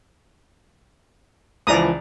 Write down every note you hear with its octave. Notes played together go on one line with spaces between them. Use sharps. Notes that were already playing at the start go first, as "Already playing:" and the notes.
C#2 E3 F3 D5 A#5 D#6